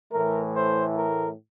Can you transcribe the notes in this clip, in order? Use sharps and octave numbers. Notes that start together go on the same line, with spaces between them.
A2 E3 A3 A#4
C5
A#4